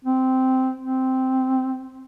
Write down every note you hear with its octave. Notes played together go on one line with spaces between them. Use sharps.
C4
C4